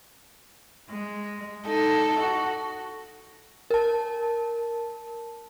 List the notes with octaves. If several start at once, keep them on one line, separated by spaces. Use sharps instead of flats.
G#3
D#4 A4
F#4
A#4 A5